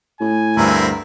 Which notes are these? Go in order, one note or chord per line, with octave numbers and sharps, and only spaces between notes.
A2 G#5
D2 G2 C4 E4 A#4